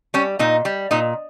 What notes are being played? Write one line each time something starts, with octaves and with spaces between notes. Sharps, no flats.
G3 C#4
A#2 D#4
G3
A#2 D#4